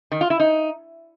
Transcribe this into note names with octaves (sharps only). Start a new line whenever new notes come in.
D#3
F4
E4
D#4